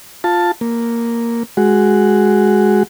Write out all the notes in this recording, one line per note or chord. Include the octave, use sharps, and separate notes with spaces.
F4 A5
A#3
G#3 F#4